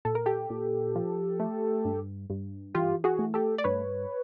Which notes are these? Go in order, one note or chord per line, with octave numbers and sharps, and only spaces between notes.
A#2 A4
A#4
G4 A4
A#2
F3
A3
G2
G2
E3 F4 G4
F#4 G#4
A3
G4 A4
D5
G2 B4 C#5